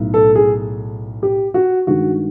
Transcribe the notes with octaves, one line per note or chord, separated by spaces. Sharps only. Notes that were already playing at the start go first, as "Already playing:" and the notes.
Already playing: B1 A2
A4
G#4
G4
F#4
G2 D#3 G#3 F#4